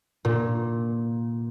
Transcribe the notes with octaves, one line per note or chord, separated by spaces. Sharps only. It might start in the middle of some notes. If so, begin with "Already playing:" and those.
A#2